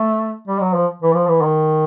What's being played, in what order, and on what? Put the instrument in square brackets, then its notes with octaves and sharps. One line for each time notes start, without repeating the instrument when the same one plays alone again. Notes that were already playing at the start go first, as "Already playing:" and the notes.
Already playing: [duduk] A3
G3
F#3
F3
E3
F3
E3
D#3